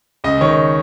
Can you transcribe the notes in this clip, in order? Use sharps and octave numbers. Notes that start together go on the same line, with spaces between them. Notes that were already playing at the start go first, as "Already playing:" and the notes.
C#2 D#5
D#3 C#5